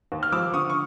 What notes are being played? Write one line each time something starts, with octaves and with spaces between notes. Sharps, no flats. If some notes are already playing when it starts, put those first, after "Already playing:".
D#2
F6
F3 D6 E6
D3 C#6 D#6
C#6